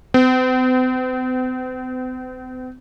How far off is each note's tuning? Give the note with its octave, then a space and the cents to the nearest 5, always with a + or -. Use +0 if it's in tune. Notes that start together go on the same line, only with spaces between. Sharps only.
C4 -45